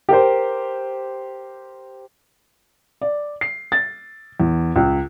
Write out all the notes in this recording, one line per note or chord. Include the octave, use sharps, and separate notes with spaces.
G4 A#4 C5
D5
C7
A6
E2
C#2